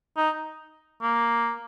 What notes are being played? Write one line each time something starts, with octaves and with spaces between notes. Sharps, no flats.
D#4
A#3